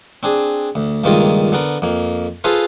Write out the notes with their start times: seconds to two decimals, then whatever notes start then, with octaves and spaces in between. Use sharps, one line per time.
0.23 C4 D4 G#4
0.75 D2
1.04 C#2 G2 D#3 A#3 F4 D#5
1.52 D3 B3 A#4
1.82 F2 A#3
2.44 F4 G#4 A4 B4 C5 F5